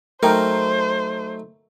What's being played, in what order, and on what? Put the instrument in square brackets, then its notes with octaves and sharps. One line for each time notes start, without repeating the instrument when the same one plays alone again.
[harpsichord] F#3 A3 D#4 [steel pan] A#4 G5 [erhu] C5